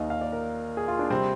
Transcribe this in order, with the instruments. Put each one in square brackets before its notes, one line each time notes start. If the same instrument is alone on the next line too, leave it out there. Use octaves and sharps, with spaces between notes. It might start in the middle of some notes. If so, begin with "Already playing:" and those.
Already playing: [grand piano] D#2 D#3 A#3 D#5 F5
F5
D5
A#4
G#4
F4
D4
C3 G3 C4